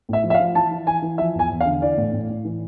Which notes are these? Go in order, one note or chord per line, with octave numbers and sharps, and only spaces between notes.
A2 E5
F3
E5
F5
F3
E3 A5
E3
E3 G#5
E3
F3 E5
E2 G#5
E2
F5
D3
E3 D5
A2
A2
A2
E3